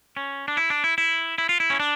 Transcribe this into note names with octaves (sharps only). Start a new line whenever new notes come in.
C#4
D4
E4
D4
E4
E4
E4
F4
E4
C#4
D4